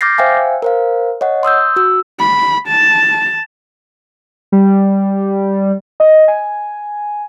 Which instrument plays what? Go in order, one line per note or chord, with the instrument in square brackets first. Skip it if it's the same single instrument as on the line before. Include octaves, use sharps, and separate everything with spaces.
[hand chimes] D6 F6 G6 A6 A#6 C7
C5 E5 F5 G5 G#5
A#4 C5 F5
C#5 D#5 F#5
C6 D#6 E6 G6
F#4 E6
[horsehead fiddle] B5
A5
[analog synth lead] G3
[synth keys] D#5
G#5